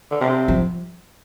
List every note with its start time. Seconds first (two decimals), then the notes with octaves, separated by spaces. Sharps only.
0.11 D3
0.21 C3
0.48 F3